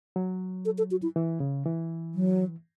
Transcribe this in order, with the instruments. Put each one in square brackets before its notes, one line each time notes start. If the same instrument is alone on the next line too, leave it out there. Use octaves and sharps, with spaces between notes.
[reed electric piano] F#3
[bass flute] A4
A4
F#4
E4
[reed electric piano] E3
C#3
E3
[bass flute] F#3